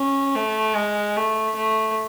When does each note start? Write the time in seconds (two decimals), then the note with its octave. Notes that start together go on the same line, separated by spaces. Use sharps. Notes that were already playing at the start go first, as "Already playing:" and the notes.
Already playing: C#4
0.35 A3
0.75 G#3
1.16 A3
1.56 A3